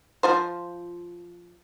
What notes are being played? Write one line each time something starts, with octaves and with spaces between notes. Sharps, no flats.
F3 F4 C5